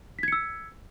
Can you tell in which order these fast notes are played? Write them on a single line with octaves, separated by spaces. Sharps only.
B6 G#6 C#7 E6